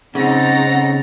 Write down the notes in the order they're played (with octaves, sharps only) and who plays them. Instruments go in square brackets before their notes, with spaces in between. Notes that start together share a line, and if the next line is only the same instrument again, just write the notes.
[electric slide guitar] C#3 [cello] C4 D#4 [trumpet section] A4 A#5 [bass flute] F#5